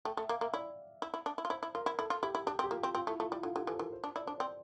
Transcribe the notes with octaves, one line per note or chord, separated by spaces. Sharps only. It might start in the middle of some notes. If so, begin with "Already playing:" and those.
A3 G5
A3 E5
A#3 F5
A#3 E5
E4 D5
E4
E4
D4
E4
F4
E4 C5
E4
F4 A#4
E4
E4 A4
F4
E4 G4
E4
D4 G4
C4
G4
A#3 F4
C4
C4 F4
A3 E4
A3 F4
G3 E4
D3 F4
D3 G4
E3 A4
C5
E3 A#4
C5
D4
E4 D5
D4 C5
C4 D5